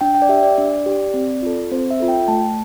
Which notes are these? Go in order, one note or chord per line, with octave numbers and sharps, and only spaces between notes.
D4 G5
G5
D5
G4 E5
D5
D4
G4
C4
F4 A4
C4 C5
E5
F4 A4
G5
A3 A5